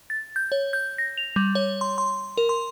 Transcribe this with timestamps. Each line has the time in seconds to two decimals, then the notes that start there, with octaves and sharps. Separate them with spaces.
0.10 A6
0.36 G6
0.52 C#5
0.73 G6
0.98 A#6
1.18 F7
1.36 G3
1.55 C#5
1.81 C6
1.98 C6
2.38 A#4
2.49 C6